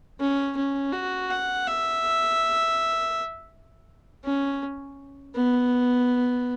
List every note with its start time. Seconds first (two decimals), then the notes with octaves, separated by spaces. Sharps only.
0.20 C#4
0.57 C#4
0.93 F#4
1.30 F#5
1.67 E5
4.25 C#4
5.36 B3